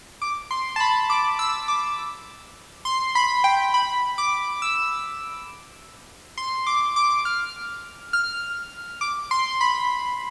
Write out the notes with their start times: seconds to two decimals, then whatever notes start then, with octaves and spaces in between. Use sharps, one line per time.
0.22 D6
0.51 C6
0.76 A5
0.80 B5
1.10 D6
1.39 E6
1.68 D6
2.85 C6
3.15 B5
3.44 G5
3.74 B5
4.18 D6
4.62 E6
6.38 C6
6.67 D6
6.96 D6
7.25 F6
8.13 F6
9.01 D6
9.31 C6
9.61 B5